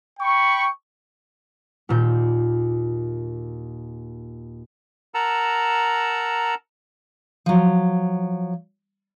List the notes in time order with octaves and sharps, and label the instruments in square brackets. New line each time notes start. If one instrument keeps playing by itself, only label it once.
[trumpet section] G5 B5 C#6
[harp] D#2 A#2 G6
[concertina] A#4 F#5 A5 A#5 E6
[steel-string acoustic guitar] F3 F#3